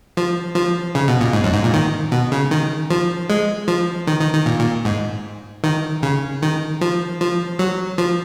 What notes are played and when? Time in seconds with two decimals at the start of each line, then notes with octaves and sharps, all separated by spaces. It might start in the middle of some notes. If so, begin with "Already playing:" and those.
0.17 F3
0.55 F3
0.95 C#3
1.08 B2
1.21 A#2
1.33 G#2
1.44 F#2
1.54 G#2
1.64 A#2
1.73 D#3
2.12 B2
2.32 C#3
2.51 D#3
2.91 F3
3.30 G#3
3.68 F3
4.07 D#3
4.20 D#3
4.34 D#3
4.46 A#2
4.60 A#2
4.85 G#2
5.64 D#3
6.03 C#3
6.42 D#3
6.81 F3
7.20 F3
7.59 F#3
7.98 F3